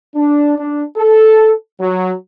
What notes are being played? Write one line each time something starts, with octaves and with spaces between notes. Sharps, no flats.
D4
D4
A4
F#3